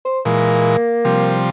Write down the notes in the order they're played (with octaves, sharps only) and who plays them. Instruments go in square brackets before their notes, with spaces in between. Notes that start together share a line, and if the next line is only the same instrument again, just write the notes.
[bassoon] C5
[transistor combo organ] A#2 E3 G#3 [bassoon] A#3
[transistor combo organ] C3 F3 G3